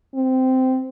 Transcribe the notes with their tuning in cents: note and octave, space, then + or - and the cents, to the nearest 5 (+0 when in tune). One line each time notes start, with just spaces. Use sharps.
C4 -15